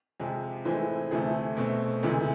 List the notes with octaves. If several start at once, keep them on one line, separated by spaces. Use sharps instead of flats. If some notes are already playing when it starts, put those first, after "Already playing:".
F2 C3 G#3
A2 E3 G#3 C4
D2 C3 E3 A3 C4 G#4
B2 A3 C4
D2 C3 E3 G#3